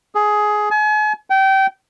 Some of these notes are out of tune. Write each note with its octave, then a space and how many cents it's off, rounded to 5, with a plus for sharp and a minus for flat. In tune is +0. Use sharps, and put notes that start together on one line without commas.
G#4 +15
G#5 +40
G5 -25